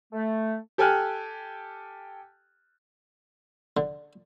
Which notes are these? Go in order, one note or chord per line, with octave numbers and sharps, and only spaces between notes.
A3
G4 A4 G5 G#5 F6 F#6
D3